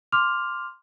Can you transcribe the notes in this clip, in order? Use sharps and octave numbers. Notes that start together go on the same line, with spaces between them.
C6 D6 F6 F7